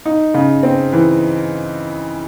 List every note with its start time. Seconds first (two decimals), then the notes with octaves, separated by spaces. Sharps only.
0.05 D#4
0.34 C#3
0.63 C4
0.93 E3